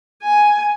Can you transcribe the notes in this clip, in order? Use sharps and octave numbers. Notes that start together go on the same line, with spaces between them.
G#5